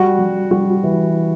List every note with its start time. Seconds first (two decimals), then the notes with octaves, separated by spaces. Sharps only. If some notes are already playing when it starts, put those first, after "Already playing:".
Already playing: G3 F#4
0.19 G3
0.51 G3 F#4
0.84 E3